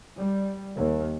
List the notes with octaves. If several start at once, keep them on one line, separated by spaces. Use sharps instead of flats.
G3
D#2